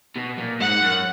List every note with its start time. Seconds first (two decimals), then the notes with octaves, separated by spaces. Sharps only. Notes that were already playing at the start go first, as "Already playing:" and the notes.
0.16 B2
0.38 A#2
0.60 G#2 F#5
0.82 F#2